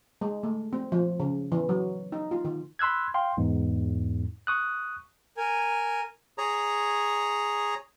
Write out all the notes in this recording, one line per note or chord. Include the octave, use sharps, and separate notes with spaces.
G#3
A3
C4
F3
C#3
E3
F#3
D#4
F4
D#3
B5 C6 E6 F#6 G#6
F5 G5 C6
E2 G#2
C#6 D#6 F#6
A#4 G#5
G#4 C#5 A#5